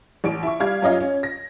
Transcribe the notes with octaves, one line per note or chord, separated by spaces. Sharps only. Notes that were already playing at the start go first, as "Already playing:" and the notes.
A1 D7
E4 C#6
G3 F5 G#6
F#2 C#4 F4 D#5 F5
C#4
A#6